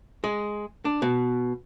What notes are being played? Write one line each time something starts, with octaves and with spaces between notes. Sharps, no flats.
G#3
D4
B2